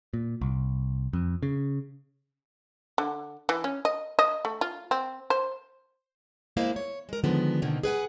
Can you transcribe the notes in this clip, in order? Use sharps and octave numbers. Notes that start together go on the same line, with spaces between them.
A#2
C2
F2
C#3
D3
E3
C#4
D#5
D#5
A3
F4
C4
C5
G#3 A#3 E4 C5 F5
C#5
G#3 A#4
D3 D#3 F3 G#3 B3
B2 D3 D#3 A#3 C4
G#4 B4 F#5 G#5